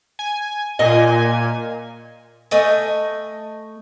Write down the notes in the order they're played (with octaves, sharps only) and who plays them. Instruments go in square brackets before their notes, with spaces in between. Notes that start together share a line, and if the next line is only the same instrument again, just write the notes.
[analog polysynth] G#5
[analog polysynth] A#2 G#5 [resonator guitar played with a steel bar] D#5
[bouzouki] A3 D#5 G#5